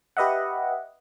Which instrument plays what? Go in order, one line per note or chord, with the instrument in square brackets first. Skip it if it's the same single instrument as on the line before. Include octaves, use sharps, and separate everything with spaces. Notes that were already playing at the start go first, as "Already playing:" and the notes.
[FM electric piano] G4 B4 D#5 E5 F#5